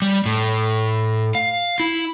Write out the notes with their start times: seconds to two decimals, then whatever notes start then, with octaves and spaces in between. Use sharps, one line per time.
0.02 G3
0.26 A2
1.35 F5
1.80 E4